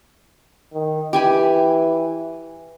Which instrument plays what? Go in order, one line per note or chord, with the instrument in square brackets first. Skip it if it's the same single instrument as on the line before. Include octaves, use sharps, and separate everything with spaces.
[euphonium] D#3
[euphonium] E3 [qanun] G4 G#5 B5